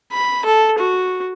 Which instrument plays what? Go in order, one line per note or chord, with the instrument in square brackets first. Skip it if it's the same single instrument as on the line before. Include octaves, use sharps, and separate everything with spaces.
[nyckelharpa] B5
A4
F#4